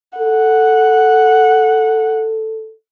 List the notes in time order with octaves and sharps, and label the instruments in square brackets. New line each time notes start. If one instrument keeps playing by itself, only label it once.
[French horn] A4 [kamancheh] F#5